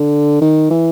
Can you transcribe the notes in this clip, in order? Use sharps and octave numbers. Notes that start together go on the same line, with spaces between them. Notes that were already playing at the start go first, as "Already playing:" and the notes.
Already playing: D3
D#3
E3